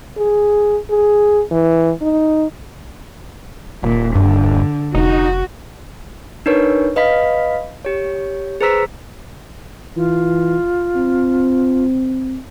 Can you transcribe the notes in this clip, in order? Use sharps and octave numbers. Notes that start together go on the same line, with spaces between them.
G#4
G#4
E3
D#4
D#1 A#2
G2 D3
F1 D#4 F#4
D4 D#4 A#4 B4 C#5 C#6
B4 D#5 F5 B5 B6
G4 C#5
G#4 B4 C5 A#5 E6 B6
E3 F4
C4